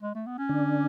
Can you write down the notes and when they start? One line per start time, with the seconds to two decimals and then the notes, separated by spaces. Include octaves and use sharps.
0.03 G#3
0.15 A3
0.27 B3
0.38 C#4
0.49 D3 D4